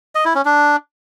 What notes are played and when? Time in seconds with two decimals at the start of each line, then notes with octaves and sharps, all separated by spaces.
0.15 D#5
0.25 E4
0.35 C#4
0.45 D4